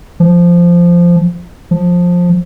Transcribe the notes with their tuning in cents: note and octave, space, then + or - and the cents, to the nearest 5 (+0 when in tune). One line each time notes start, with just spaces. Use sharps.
F3 -10
F3 +15